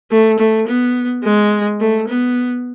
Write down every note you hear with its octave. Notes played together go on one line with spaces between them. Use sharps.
A3
A3
B3
G#3
A3
B3